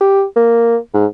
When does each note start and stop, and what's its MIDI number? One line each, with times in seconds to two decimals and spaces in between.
0.01 0.23 67
0.36 0.77 58
0.94 1.06 44